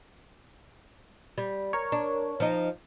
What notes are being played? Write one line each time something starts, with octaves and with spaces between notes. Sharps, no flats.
G3
A#4 C#5
D4
F3 D#4